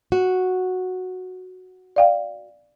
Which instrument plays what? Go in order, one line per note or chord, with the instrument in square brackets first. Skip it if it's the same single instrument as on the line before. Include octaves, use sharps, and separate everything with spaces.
[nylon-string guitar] F#4
[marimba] D5 F5 G5